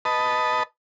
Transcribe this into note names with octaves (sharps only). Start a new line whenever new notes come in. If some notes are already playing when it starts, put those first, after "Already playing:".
B4 D#5 A5